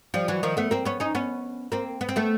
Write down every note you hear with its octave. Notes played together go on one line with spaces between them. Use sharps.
F3 G3
E3 F#3
D#3 F3
A3 B3
A#3 C4
B3 C#4
C#4 D#4
B3 C#4
A#3 C4
B3
C4
A3 B3